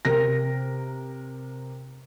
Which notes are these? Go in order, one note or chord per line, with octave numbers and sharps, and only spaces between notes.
C3 A#4 A#6